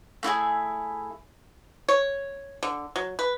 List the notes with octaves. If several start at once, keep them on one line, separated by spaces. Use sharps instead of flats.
A3 E4 F#4 G#4
C#5
D3
F#3
B4